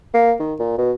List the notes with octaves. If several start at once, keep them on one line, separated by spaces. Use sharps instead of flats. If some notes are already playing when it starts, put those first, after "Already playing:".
A#3
D#3
A#2
B2